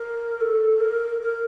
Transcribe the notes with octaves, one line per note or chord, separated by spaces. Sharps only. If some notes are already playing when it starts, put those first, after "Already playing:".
Already playing: A#4
A4
A#4
A#4